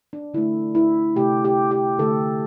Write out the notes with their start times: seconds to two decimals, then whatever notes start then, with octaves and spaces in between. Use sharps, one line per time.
0.13 D4
0.34 D3 A3 E4
0.75 E4
1.16 C3 A3 G4
1.45 G4
1.71 G4
1.99 D3 A3 A4